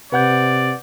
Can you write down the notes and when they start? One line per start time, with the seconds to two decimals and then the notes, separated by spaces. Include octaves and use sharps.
0.12 C3 B4 D5 F#5 G6